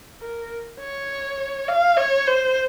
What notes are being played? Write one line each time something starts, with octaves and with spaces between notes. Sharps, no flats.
A#4
C#5
F5
C#5
C5